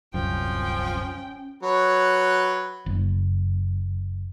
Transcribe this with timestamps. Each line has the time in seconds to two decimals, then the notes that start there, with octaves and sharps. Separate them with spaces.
0.14 D1 C2 F#2 F3 C#4 G5
1.63 F#3 B4 C#5
2.86 F#1